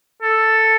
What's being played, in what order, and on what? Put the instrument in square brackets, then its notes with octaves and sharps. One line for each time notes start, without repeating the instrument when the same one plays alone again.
[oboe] A4